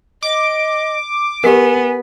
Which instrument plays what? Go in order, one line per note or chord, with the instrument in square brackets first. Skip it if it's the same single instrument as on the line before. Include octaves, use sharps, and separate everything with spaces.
[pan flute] D#5 [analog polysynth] D6
[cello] B3 [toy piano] G4 A#4 [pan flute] G#5